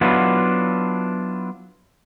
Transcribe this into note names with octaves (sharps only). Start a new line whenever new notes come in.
F#3 B3 D4 E4 F4